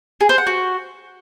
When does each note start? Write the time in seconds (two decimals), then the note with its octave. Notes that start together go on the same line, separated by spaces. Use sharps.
0.21 G#4
0.29 C5
0.38 F#5
0.47 F#4